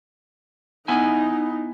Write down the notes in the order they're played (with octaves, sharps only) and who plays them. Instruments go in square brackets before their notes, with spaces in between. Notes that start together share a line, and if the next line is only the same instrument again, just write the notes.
[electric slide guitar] B3 E4 G#5 [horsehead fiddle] D#4